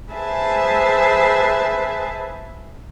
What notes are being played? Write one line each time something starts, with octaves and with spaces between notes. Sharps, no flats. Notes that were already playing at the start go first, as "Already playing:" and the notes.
G#4 B4 C5 E5 G#5 A5